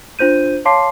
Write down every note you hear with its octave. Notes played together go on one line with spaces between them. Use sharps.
D4 F4 C5 G6 D#7
C#5 F5 A5 C6 D6 C7